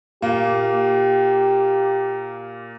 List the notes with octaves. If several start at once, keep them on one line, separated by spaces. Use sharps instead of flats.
A#2 A#3 G4